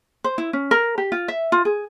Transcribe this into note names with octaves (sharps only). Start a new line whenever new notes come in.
C5
E4
C#4
A#4
G4
F4
E5
F4
G#4